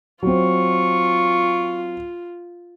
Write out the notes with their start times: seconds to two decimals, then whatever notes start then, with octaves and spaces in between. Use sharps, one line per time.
0.23 F#3 C4 F4 C#6